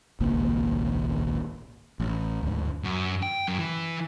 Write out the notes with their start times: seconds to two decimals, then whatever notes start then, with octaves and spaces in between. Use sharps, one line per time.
0.20 D#1 G#1 C#2 A#3
2.00 A1
2.43 D2 G#2
2.84 F#2
3.23 G5
3.48 F#2
3.59 E3